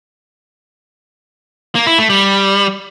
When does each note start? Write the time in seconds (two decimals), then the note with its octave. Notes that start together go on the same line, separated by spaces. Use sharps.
1.75 A#3
1.87 E4
1.98 A3
2.10 G3